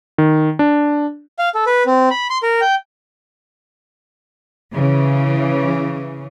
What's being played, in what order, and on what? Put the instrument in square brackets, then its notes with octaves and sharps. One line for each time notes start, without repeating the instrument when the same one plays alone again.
[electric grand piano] D#3
D4
[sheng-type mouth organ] F5
A4
B4
C4
B5
C6
A#4
G5
[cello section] C#3 E3